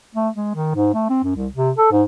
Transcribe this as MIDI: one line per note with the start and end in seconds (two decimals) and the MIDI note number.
0.15 0.29 57
0.35 0.51 56
0.55 0.71 51
0.75 0.89 44
0.94 1.09 57
1.09 1.20 60
1.24 1.36 42
1.36 1.48 36
1.54 1.71 48
1.78 1.89 69
1.91 2.03 44